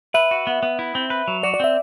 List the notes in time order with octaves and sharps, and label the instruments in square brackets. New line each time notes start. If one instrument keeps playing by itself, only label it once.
[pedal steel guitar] B4 [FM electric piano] E5
[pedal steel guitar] F#4
B3
B3
E4
C4
B4
F#3
[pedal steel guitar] F#4 [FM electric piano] D5
[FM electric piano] D5
[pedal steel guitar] C4 [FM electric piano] E5